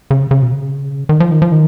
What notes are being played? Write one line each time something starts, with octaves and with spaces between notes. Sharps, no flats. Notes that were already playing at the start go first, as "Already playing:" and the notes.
C#3
C#3
B2
C#3
D#3
F3
D#3
F3
D#3